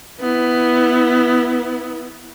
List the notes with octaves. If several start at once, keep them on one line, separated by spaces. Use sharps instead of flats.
B3 E4